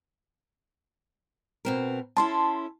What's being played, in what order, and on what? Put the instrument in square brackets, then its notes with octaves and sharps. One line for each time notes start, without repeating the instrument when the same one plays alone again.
[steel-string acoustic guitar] B2 C4 A#4
[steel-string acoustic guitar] C#4 E4 A4 [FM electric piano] A5 C6